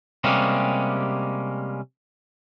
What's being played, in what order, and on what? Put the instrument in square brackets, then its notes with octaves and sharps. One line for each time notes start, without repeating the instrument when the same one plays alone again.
[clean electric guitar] C3 G3 G#3 A#3 C#4